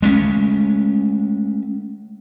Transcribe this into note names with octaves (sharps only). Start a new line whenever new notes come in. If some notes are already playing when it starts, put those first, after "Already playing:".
G#3 A3 C#4